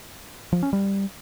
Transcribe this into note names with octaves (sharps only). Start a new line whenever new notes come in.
F3
C#4
G3